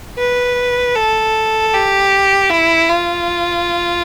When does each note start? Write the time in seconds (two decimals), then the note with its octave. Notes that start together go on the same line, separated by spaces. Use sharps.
0.18 B4
0.95 A4
1.73 G4
2.50 E4
2.89 F4